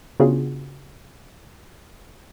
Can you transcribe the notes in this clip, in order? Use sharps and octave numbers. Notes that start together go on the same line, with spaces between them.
C#3 B3 D4 F4 F#4 G#4